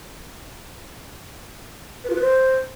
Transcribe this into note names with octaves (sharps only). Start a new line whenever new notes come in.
B4
F4
B4
C5